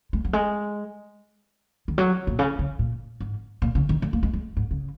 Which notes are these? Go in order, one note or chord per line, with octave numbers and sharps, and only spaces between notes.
G#3
F#3
G#3
D#3
F#3
A#2
C#3
C#3
A#2
G#2
A#2
C#3
D#3
G#3
A#3
G#3
G#3
G#2
C#3